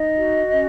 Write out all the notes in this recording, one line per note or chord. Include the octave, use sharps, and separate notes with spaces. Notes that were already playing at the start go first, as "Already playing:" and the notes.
Already playing: D#4 D#5
F#4
C#4